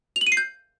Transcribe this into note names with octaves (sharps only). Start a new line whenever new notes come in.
F7
F#7
D#7
C7
G6